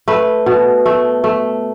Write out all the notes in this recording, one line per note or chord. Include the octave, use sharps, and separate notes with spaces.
A3 B4
B2
A3
A3